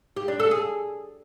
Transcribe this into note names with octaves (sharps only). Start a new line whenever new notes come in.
G4
D4
A4
G#4